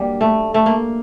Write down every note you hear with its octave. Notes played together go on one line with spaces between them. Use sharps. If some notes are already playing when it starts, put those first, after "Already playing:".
Already playing: G2 F#3 G3 A#3
A3
A3
A#3